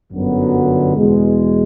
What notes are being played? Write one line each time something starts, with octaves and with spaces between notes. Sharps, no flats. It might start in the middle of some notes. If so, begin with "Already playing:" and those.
G1 F#2 D3 F#3 B3
E2 B2 G#3